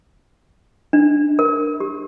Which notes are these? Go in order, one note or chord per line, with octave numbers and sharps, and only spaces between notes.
D4
A#4
G4